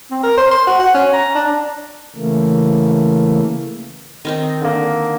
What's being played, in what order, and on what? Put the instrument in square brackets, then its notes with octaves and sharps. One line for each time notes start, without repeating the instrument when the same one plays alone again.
[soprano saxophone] C4
A#4
C5
C6
F#4
F#5
C#4
A#5
D4
[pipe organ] C#3 E3 A3 A#3
[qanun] D#3 C4 D#4
[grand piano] D3 A#3